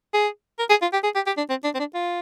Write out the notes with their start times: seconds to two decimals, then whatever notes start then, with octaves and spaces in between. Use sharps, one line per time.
0.14 G#4
0.59 A#4
0.70 G#4
0.82 F4
0.93 G4
1.04 G#4
1.15 G4
1.27 G4
1.37 D4
1.50 C4
1.64 D4
1.75 C4
1.79 D4
1.94 F4